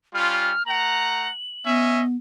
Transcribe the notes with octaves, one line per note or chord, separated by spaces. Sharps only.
G3 C#4 F4 F6
A3 F#5 A#5 F#7
B3 C#4 D#5 E5